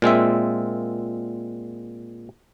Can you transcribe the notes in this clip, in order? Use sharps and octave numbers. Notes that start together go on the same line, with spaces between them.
A#2 G#3 C4 E5